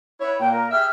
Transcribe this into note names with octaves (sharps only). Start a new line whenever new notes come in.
E4 B4 C#5
A#2 A#3 G5
A#4
G4 G#4 E5 F6